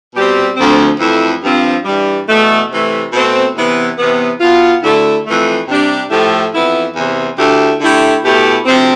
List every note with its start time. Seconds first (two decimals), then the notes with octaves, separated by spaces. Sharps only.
0.15 B2 G3 C4 G4
0.57 D2 D3 F3 A3 C4
1.00 F2 E3 A3 E4
1.42 G2 F3 C4 F4
1.85 G2 E3 G3
2.27 E2 B2 A3
2.70 C3 E3 A3
3.13 B2 A3 C4
3.54 E2 C3 E3 B3 E4
3.98 E2 C3 E3 B3
4.40 B2 B3 F4
4.82 D2 D3 A3 E4
5.25 F2 E3 A3
5.68 C3 G3 D4 G4
6.10 A2 F3 A3 E4 G4
6.53 F2 E3 B3 E4
6.95 E2 C3 E3
7.38 D2 D3 A3 E4 G4
7.80 D3 A3 E4 G4
8.23 B2 A3 E4 G4
8.66 D2 C3 F3 C4